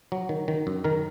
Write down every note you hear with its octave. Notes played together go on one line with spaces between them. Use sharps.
F#3
D#3
D#3
F#2
D#3 A#4